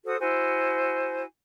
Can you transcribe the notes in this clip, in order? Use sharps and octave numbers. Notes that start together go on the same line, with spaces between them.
F#4 A4 C5 D#6
E4 F#4 C5 G#5